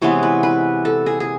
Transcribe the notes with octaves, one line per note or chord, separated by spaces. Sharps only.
C3 E3 G#3 B3 C#5
B4
B4
A4
G#4
G#4